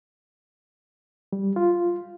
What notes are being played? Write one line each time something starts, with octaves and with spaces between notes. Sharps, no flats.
G3
F4